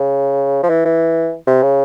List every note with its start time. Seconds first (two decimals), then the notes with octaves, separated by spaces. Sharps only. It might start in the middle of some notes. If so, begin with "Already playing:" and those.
Already playing: C#3
0.63 F3
0.70 E3
0.86 E3
1.47 C3
1.63 C#3